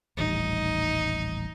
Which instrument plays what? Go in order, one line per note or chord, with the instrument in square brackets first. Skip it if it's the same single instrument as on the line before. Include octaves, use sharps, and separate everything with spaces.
[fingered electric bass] D#1 A1 G3 [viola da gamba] D#4